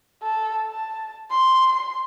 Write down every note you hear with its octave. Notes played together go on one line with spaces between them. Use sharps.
A4
A5
C6